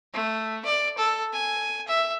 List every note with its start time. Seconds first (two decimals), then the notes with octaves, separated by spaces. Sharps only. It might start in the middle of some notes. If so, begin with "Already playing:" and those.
0.14 A3
0.65 D5
0.98 A4
1.33 G#5
1.88 E5